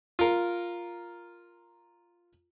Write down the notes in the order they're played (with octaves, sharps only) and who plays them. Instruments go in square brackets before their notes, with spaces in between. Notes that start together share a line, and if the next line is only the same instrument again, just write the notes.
[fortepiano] F4 A#4